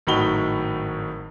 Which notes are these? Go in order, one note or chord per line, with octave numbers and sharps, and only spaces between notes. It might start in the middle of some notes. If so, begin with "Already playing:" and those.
G#1 A2 F#3 D#4 B5 G7